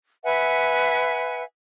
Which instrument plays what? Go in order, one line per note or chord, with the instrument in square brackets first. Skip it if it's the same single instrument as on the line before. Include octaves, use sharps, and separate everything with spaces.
[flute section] B4 E5 F#5 G#5